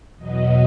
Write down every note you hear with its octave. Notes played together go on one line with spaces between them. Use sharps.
E2 B2 F#3 B3 D#5